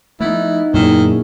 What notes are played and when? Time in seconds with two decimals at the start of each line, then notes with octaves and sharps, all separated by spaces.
0.20 F3 A3 B3 D#4 E4
0.74 F#2 A#2 D#3 B3 C#4 E4 G#4